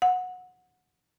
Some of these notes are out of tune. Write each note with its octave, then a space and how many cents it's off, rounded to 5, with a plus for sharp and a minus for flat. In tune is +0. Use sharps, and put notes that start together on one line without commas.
F#5 -20